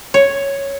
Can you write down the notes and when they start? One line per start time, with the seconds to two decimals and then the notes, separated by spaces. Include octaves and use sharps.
0.14 C#5